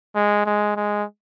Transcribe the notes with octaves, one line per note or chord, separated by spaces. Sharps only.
G#3
G#3
G#3